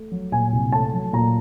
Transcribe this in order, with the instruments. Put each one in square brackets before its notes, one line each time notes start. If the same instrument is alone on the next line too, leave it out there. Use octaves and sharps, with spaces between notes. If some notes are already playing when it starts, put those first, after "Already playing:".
Already playing: [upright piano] A3
F#3
A#2 G#5
C2
A3 A5
F#3
A#2 A#5